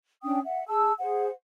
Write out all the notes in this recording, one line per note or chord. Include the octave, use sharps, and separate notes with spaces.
C#4 D4 G5 D#6
E5 F#5
G#4 A5 E6
G#4 C5 F#5